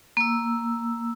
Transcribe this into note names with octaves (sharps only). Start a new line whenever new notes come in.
A#3 E6